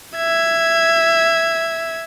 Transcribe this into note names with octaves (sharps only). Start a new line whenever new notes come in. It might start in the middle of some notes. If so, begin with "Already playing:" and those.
E5 G#6